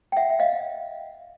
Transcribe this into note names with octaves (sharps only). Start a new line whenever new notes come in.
G5
E5 F#5
E5
D#5 F5